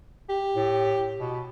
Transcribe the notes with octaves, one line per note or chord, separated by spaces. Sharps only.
G4
A2
B2